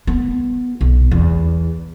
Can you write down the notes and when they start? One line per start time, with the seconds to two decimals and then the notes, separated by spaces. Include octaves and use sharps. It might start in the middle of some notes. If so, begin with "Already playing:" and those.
0.07 B3
0.81 B1
1.11 E2